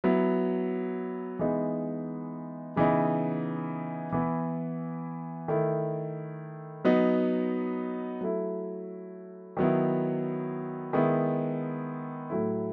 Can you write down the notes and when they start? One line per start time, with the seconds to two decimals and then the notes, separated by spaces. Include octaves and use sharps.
0.04 F#3 B3 E4
1.39 E3 G#3 B3 D#4
2.76 C#3 E3 B3 D#4
4.13 E3 B3 E4
5.48 D#3 A3 E4
6.85 F#3 B3 D#4
8.21 F#3 A3 E4
9.57 D#3 F#3 B3 E4
10.93 D#3 G#3 B3 E4
12.30 A2 F#3 A3 E4